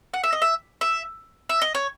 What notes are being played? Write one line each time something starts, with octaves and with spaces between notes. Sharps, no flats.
F#5
E5
D#5
E5
E5
E5
D#5
C#5